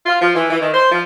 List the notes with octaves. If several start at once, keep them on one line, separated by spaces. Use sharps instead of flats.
F4
F3
E3
E3
D#3
C5
F3